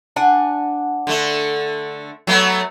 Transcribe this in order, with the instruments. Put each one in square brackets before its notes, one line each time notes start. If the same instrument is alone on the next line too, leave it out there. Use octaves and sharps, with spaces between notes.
[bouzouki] D4 F#5 G#5
[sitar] D3 A3
F#3 A3 B3